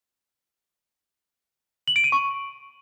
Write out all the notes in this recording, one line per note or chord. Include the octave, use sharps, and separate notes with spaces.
F#7
D7
D#7
C#6